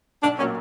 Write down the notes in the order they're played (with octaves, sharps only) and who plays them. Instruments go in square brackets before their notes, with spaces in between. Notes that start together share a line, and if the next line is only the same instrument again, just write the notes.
[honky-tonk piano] B1 [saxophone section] D4
[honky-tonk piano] A#2 F#3 A#3 [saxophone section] C#4